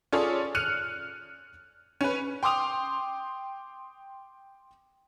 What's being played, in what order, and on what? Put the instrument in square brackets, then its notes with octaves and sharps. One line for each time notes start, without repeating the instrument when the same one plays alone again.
[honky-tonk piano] C#4 F4 G#4 A4 C#5 D5
F6 F#6 C#7 D#7 F7
C#4 B4
G5 C6 D6 D#6 F7